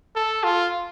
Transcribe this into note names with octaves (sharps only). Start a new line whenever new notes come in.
A4
F4